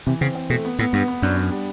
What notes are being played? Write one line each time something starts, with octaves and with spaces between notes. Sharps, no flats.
C3 E3
C#3 C4
C4
B2 A3
B3
A2 B3
G2 B3
B3
F#2 D4
D4
G3